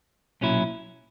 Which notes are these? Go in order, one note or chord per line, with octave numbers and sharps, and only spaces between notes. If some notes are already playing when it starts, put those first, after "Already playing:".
B1 A#2 F#3 C#4 E4